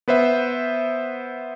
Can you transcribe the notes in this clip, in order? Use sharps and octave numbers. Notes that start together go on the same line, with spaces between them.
B3 B4 C5 E5